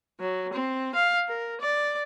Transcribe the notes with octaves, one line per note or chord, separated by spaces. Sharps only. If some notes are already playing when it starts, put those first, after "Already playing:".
F#3
C4
F5
A#4
D5